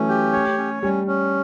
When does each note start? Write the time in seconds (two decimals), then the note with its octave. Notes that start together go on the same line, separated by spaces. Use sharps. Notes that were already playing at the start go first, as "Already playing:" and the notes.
Already playing: E3 F#3 A3 C#4
0.09 G4
0.33 C#5
0.58 C#4
0.83 G3 C#4
1.07 C#4